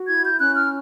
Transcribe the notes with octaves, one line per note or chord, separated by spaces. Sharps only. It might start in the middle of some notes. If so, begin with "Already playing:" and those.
Already playing: F#4
E4 G#6
G6
C#4 F#6
F6